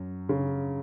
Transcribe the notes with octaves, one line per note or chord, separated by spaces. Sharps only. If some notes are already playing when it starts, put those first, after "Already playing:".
Already playing: F#2
C#3